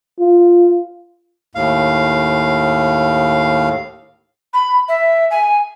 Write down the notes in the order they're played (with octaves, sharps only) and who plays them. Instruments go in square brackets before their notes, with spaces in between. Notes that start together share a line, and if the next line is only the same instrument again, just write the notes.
[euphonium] F4
[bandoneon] D#2 A2 F5
[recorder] B5
E5
G#5